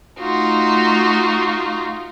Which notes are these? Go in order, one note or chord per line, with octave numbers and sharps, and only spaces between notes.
A3 D#4 F4 F#4